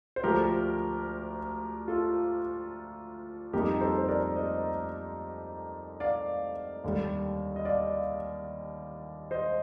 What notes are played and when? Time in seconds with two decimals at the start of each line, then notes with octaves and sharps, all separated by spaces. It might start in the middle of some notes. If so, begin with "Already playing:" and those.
0.16 C5
0.23 D2 D3 F3 G4 A#4
1.88 F4 A4
3.53 F2 D3 G3 A#3 D#4 G4 A#4
3.81 A4 C5
3.98 C5
4.08 A#4 D5
4.36 C5 D#5
6.00 D5 F5
6.84 D#2 D3 G3
7.56 D#5
7.65 D5 F5
9.31 C5 D#5